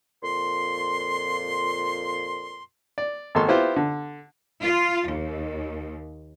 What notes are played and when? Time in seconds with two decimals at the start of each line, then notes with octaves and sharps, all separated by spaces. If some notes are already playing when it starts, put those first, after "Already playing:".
0.23 F2 A#2 C6
2.98 D5
3.35 G#1 A#3 A4 C6 C#6
3.48 B3 E4 F4 G4 C5
3.76 D3
4.62 F4
5.08 D#2